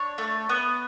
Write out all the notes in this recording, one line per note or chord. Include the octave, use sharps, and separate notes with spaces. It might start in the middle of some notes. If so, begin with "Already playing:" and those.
Already playing: D4 C#5
A3
B3